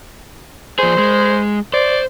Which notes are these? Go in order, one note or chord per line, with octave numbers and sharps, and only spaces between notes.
F3 G#4 C5
G#3
C5 D5